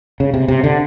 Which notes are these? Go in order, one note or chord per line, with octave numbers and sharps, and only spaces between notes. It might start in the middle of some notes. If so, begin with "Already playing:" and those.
C#3
C3
C3
D3